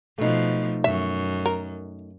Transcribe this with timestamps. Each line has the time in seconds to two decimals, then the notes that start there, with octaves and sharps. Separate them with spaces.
0.18 B2 F3 A3 D#4
0.84 F#2 E5
1.46 A#4